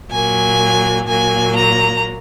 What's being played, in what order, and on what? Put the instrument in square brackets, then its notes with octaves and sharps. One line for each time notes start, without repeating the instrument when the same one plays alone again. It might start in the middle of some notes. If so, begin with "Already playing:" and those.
[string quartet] A#2 F#3 A#3 G#5
A#2 F#3 A#3 G#5
A#5